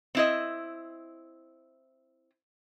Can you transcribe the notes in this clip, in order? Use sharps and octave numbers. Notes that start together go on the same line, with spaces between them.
C4 E4 D#5